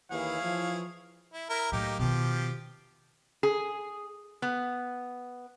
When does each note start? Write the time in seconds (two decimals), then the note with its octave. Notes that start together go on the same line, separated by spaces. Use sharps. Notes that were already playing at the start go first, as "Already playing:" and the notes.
0.11 D#2 E3 E4 G#4 C#5 F5
0.41 E3 F3
1.33 E4
1.50 E4 A#4
1.72 A2 F#3 A#3 D#4 G4
1.99 B2 D#3 F3 G4
3.43 G#4
4.42 B3